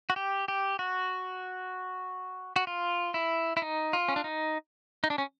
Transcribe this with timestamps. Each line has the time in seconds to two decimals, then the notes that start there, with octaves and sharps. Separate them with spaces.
0.10 F#4
0.16 G4
0.48 G4
0.79 F#4
2.56 F#4
2.67 F4
3.14 E4
3.57 E4
3.62 D#4
3.93 F4
4.08 C#4
4.16 D4
4.24 D#4
5.04 D#4
5.10 D4
5.18 C#4